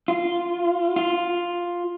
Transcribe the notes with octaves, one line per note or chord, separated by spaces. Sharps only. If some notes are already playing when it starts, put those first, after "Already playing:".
F4
F4